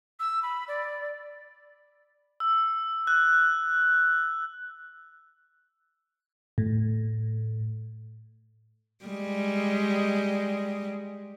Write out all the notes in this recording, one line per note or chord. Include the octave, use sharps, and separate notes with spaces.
E6
B5
D5
E6
F#6
A2
G3 G#3